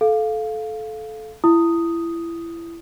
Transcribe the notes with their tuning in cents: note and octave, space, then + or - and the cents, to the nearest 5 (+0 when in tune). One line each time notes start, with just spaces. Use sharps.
A4 -20 F5 +0
E4 +25 D#6 +0